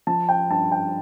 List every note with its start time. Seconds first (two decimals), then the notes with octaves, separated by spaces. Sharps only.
0.07 F3 A5
0.29 G5
0.50 G2 A5
0.72 G5